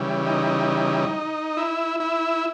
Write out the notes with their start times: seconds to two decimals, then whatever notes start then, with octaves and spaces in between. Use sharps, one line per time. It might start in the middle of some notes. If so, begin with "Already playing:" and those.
Already playing: C#3 E3 G3
0.26 D#4
1.57 E4
2.00 E4